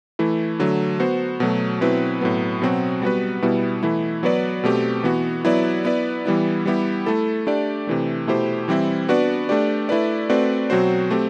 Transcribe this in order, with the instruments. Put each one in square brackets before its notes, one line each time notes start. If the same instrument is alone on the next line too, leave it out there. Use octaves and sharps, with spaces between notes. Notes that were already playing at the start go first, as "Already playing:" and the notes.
[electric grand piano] E3 A3 E4
D3 F#3 A3
B3 F#4 C5
B2 F#3 A3
B2 F#3 C4 E4 B4
A2 F#3 B3
B2 F#3 C4 F#4
G3 B3 F#4 B4
B2 G3 B3 E4
E3 A3 E4
F#3 B3 F#4 B4 D5
B2 A3 C4 G4
E3 B3 F#4
F#3 B3 E4 B4 D5
B3 E4 B4 D5
E3 G3 B3 E4
G3 B3 E4 G4
A3 E4 A4
A3 D4 G4 D5
C3 E3 A3
B2 A3 E4 G4 C5
E3 G3 C4 E4
B3 D4 F#4 B4 D5
A3 D4 G4 D5
A3 E4 B4 D5
A3 C4 F#4 B4 D5
B2 F#3 C4 F#4 C5
A3 C4 G4